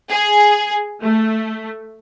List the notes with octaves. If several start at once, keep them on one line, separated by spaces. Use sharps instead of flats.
G#4
A3